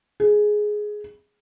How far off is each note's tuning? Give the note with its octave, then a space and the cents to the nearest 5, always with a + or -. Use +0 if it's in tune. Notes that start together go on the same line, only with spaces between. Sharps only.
G#4 +10